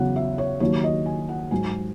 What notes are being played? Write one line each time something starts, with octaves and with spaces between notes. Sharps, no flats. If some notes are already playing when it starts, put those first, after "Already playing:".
Already playing: E2 C#3 F#3 F#5
E5
C#5
D#2 D#3 F#3 C#5
D#5
G#5
F#5
G#2 F#3 G#5